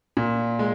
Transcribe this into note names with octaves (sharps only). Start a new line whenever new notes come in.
A#2
G#3